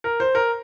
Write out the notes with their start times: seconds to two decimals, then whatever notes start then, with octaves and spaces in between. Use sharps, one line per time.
0.04 A#4
0.20 C5
0.35 A#4